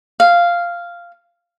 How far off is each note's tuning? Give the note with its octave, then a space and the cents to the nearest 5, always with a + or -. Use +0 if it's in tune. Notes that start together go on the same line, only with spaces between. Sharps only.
F5 -5